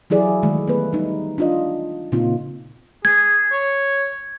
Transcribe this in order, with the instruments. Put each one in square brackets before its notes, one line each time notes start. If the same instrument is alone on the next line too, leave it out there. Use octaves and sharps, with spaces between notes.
[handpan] E3 F#3 E4 G#4 D5
D#3 E3 G#3 A3
A3 B3 B4
G3 D#4
D4 F4 D#5
A#2 C#3 A#3 C4 D#4 F4
[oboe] G#4 [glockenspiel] G#6
[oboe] C#5